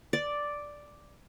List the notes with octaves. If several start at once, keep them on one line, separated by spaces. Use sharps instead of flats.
D5